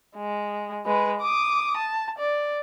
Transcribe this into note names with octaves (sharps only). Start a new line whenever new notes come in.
G#3
G#3 B4
D6 D#6
A5
D5